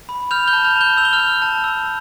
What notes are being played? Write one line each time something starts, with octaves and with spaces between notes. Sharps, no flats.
B5
F6 G6 F7
G6 G7
A5
F6 F7
A5
G6 G7
E6 F7
G7
F6 F7
G6
A5
E6